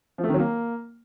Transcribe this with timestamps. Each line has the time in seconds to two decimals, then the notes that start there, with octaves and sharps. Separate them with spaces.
0.18 F3
0.24 A3
0.29 D#3
0.34 F#3
0.39 A#3